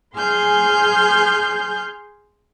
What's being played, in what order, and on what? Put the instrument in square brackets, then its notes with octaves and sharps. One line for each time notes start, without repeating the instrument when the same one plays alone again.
[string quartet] G#4 G#5 C6 F6 G6